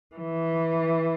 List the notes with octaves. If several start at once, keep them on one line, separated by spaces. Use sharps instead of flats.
E3